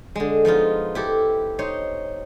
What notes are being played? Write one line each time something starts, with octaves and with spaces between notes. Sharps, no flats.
D3 G#3
F3 B3 D#4 F4
E4 G4 A4
D#4 C5 C#5